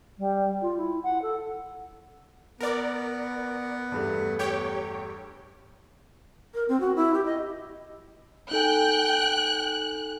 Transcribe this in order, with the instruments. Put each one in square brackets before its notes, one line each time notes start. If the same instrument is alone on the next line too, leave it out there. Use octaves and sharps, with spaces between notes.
[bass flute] G3
F4
E4
F#5
A4
[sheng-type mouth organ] B3 [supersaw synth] A#4 D5
[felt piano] E2 G2 A3
[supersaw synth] G4 C#5 G5
[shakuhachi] A#4
C4
F#4
E4
G4
D#5
[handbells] D#4 A4 G#5 [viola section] G5 [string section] F#6